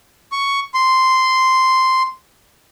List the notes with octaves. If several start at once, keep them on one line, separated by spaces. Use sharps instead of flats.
C#6
C6